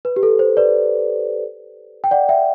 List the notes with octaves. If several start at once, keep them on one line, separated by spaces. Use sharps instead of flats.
B4
G4
A4
C5
B4 D5
G5
D5 F#5
E5 G5